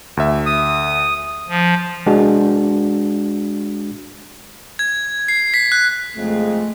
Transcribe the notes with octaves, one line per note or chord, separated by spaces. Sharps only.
D2 E5
D#6
F3
G#3 D4 F#4
G#6
C7
B6
F#6
F2 C#3 G#3 A3